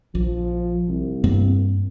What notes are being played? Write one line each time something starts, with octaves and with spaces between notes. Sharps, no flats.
A#1 F3
C2
G2 A#3 C4